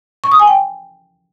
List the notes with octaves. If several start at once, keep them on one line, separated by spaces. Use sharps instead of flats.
C#6
D#6
G#5
G5